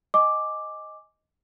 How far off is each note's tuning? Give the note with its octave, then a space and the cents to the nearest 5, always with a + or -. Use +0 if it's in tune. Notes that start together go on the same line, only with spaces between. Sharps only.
D#5 +0 G#5 +0 D6 +0